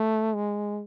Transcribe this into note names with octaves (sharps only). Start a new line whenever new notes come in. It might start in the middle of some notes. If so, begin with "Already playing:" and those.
Already playing: A3
G#3